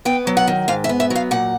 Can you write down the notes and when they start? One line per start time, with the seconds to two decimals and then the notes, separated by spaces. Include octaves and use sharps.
0.05 B3 G5
0.27 F#3
0.37 F#5
0.48 D#3
0.68 G#2 F5
0.84 E5
0.89 B3
1.00 E5
1.10 F#3
1.15 F5
1.31 A#2 F#5